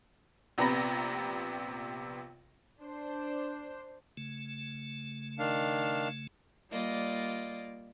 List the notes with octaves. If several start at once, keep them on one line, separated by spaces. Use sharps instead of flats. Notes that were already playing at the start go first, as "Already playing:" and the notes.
A#1 C3 B3 A#5 B5 A#6
D4 C5
C#3 A3
D#3 D4 F5
G3 A#3 F4 D5 D#5